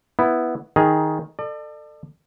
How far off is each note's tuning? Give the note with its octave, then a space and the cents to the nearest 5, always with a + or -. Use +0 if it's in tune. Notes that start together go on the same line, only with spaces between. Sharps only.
B3 +0 E4 +0
D#3 +10 G#4 +0 A#5 +20
A4 +20 D5 +40